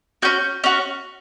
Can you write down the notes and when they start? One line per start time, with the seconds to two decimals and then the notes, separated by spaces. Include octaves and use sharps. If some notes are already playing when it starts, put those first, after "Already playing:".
0.22 C#4 F#4 G6
0.64 C#4 F#4